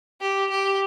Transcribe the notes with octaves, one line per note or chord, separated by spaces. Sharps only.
G4
G4